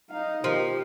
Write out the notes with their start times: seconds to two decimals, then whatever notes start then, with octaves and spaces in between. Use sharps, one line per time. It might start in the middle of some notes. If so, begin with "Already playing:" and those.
0.10 D#4 F5
0.44 B2 D#3 F3 G4